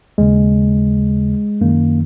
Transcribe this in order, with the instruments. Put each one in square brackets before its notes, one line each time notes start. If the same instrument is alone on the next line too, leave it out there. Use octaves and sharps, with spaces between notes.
[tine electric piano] D#2 C#3 G#3
F#2 D#3 A#3